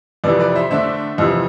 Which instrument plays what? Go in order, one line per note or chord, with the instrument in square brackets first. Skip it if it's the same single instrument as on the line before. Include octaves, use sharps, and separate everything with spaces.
[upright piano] F2 C3 E3 B4 D5
B4 D5
C5 E5
D3 A3 D4 C5 E5
F2 C3 E3